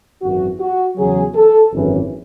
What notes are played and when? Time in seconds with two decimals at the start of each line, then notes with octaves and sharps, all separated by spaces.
0.22 G#1 F#2 E3 F#4
0.60 F#4
0.97 E2 C#3 F#3 G#4
1.35 A4
1.73 G#1 F#2 E3